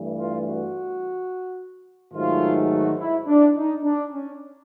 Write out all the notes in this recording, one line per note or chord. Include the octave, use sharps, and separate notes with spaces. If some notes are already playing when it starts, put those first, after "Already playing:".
Already playing: G2 E3 A3
F4
F#4
G#2 D#3 F#3 A3 F4
F#4
E4
D4
D#4
D4
C#4